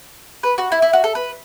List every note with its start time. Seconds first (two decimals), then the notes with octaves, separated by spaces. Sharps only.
0.43 B4
0.58 F#4
0.72 E4
0.82 E4
0.93 F#4
1.04 A4
1.15 B4